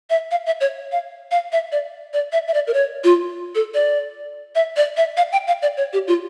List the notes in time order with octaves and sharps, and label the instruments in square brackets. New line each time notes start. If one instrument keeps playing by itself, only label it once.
[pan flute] E5
F5
E5
C#5
F5
F5
E5
D5
D5
E5
E5
D5
A#4
C#5
F4
A4
D5
E5
D5
E5
F5
G5
F5
D5
C#5
G4
F4